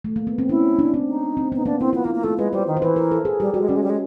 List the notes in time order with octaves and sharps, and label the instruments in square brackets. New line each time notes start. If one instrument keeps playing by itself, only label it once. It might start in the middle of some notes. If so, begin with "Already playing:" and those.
[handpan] A3
A#3
B3
C4
[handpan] C#4 [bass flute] E4
[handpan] D4
C4
[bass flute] D#4
[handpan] C4
[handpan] B3 [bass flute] D#4
[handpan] A#3 [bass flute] D4
[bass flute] C4 [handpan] E4
[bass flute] B3 [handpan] F4
[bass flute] A#3 [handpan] E4
[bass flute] A#3
[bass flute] A3 [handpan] F4
[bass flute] G#3 [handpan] B4
[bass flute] G3 [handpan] C5
[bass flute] D#3
[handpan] C5
[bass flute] E3 [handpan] B4
[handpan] A#4
A4
G#4
[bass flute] G3 [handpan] G4
[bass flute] G3 [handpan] F#4
[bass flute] G#3
[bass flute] G3 [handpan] C#4
[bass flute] G#3
G3
G#3